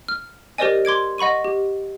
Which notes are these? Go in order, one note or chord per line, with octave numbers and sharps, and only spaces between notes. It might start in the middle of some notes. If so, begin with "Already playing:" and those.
F6
G4 A#4 C5 D5 D#5 G#5
C6 D6 G#6 D7
D#5 F#5 B5 C#6 D#7
G4